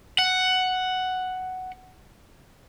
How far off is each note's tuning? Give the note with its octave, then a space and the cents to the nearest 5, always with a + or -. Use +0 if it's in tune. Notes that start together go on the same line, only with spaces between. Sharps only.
F#5 +5